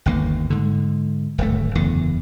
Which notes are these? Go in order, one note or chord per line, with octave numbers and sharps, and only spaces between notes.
G1 D#2 A#3
G#2 D3
D1 G#1 A3
F#1 E2 D3